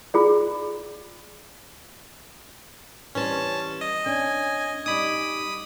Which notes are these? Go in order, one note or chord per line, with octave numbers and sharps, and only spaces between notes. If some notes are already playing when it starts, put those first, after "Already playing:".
F4 G#4 D5
E3 G3 C#4 C5 A5
D#5
C#4 D4 G#5
G3 D#4 B5 D6 D#6